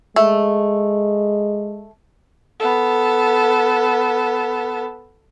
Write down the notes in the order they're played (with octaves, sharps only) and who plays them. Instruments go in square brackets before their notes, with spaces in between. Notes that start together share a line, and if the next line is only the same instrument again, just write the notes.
[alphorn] G#3 [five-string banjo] A3
[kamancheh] B3 A4